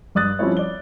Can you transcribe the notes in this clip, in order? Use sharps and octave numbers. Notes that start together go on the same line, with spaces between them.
G2 D5 D#6 F#6 A6
F3 G3 C4 C#4 E4 C#5
D5 G7